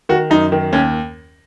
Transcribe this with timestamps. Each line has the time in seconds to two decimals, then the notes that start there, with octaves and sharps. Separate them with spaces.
0.09 D#3 F#4
0.30 F#2 D#4
0.52 D#3
0.73 D#2 C#4